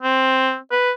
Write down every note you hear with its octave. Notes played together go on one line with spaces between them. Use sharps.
C4
B4